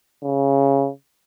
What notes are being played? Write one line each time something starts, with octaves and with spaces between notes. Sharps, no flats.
C#3